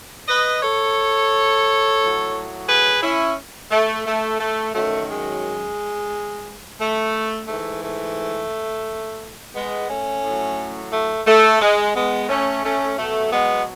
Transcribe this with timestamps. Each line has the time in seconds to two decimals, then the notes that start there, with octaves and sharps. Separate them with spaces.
0.28 B4 D#5
0.62 A4 C#5
2.00 A2 F#3
2.68 G#4 B4
3.02 C#4 E4
3.71 A3
4.06 A3
4.39 A3
4.74 F#2 D#3 F#3 A3
5.09 G#3
6.80 A3
7.48 G#2 E3 A3
7.83 A3
9.55 G#3 B3
9.89 A3 C#4
10.23 A2 F#3
10.92 A3
11.27 A3
11.61 G#3
11.95 G#3 B3
12.29 A3 C#4
12.64 A3 C#4
12.98 B2 F#3 A3
13.32 G#3 B3